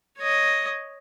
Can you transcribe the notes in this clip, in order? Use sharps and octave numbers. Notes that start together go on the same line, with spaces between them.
C#5 D#5